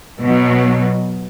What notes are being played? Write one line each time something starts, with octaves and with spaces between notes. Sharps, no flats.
B2 F#3